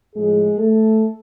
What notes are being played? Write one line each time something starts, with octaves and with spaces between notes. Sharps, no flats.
A2 F3 G#3 G#4
A3 A4